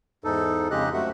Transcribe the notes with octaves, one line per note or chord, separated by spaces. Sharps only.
E2 G#2 D#4 A4
F2 C#3 G#3 G4 D#5 F#6
F#2 F3 A3 F#4 E5 F#5